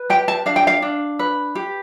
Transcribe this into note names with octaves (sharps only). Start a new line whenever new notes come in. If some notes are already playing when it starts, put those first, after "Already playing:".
Already playing: B4
G4 G5
A5
D4 F5
G5
F5
D4
B4
G4